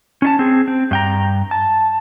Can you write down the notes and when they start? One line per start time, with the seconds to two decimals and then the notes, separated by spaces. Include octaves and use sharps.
0.22 C#4 D4 A5
0.39 C4 G#4
0.68 C4
0.91 G2 G5 A#5
1.51 A5